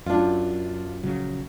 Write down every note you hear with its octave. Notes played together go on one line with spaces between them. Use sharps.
F#2 D4 F4
A#1 C#3 F#3